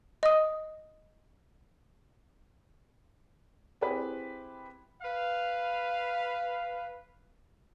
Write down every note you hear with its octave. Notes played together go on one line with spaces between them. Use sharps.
D#5 D#6
C4 E4 G4 G#4 B4
B4 F5